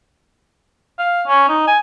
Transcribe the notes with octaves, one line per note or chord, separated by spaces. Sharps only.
F5
C#4
D#4
G#5